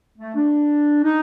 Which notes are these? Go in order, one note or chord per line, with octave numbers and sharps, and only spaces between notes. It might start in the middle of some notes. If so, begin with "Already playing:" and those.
A3
D4
D#4